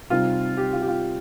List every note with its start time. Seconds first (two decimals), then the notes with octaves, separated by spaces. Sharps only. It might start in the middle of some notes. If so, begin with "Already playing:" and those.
0.10 C3 G3 C4 D#4 F4
0.57 G4
0.73 F4
0.82 G4
0.88 F4